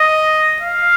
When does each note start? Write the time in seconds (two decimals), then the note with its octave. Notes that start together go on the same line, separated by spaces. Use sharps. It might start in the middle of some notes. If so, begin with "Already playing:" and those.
Already playing: D#5
0.62 F5